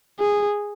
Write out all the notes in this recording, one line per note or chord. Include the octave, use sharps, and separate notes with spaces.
G#4